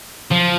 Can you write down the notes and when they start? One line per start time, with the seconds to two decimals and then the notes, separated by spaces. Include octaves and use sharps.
0.32 F3